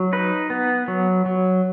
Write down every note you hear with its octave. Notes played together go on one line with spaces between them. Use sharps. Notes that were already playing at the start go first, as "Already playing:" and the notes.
Already playing: F#3
D#4 B4
B3
F#3
F#3